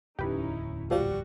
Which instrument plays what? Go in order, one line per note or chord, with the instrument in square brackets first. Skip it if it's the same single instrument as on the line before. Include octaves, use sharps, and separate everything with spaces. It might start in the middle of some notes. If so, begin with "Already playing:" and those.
[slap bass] D1 E2 [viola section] C#4 D#4 E4 [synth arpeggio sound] G4 B4
[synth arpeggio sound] A#1 F3 [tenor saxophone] G3 [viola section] F#4